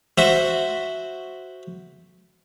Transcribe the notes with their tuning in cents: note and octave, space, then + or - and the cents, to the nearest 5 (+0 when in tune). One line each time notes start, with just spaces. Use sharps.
F#4 +0 C5 +0 E5 +0